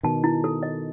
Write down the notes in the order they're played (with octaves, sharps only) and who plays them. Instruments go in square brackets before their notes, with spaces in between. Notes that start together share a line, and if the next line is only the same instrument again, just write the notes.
[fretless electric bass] B2 D#3 [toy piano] A5
[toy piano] E4
A4
D#5